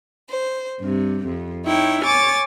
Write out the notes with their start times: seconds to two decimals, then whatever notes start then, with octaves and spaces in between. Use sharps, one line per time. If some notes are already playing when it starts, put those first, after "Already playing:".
0.30 C5
0.80 G2 C3
1.27 F2
1.64 D#4 E4 C#5 G5
2.03 C#5 G#5 D6 A6